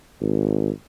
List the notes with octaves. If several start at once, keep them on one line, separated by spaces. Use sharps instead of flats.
G#1